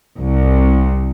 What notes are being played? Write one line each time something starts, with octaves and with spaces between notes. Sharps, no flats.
C2